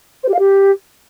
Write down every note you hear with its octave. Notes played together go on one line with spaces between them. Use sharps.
C5
G4
F5
G4